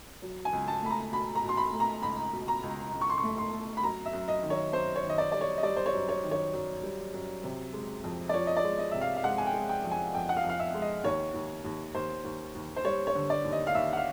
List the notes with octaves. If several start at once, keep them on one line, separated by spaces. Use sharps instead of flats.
F#3
G#5
C#2
A5
A3 B5
A#5
B2 B5
A#5
B2
C6
B5
A3
A#5
C#2 B5
B2
A#5
C#2
C#2
C#6
C6
C#6
A3
C6
A3
B5
F#2 A#5
E5
F#2
D#5
D#3
C#5
F#2 C5
C#5
D#3
D#5
D5
G3 D5
C#5
D#5
G3 D5
C5
C#5
F#2
C#5
D#3
C#5
F#2
G3
F#2
C3
G#3
F2
D5
F3 C#5
D#5
D5
G#3
D#5
C3 E5
F5
F5
G#3 F#5
G#5
G5
G#3
G5
F2
G#5
F2 G5
F#5
F5
F2
F5
E5
G#3
D#5
D#2 C#5
D#2
D#2
D#2 C5
D#2
D#2
C5
G3 C#5
C#5
D3
D5
D#2
D#5
F5
D#2 E5
F#5
F5